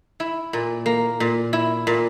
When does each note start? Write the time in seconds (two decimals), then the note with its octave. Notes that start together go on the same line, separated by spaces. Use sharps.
0.20 E4
0.53 A#2
0.86 A#3
1.20 A#2
1.53 E4
1.87 A#2